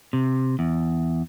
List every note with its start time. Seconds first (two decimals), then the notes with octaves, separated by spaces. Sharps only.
0.13 C3
0.59 E2